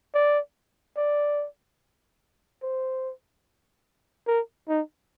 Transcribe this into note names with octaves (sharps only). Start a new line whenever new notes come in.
D5
D5
C5
A#4
D#4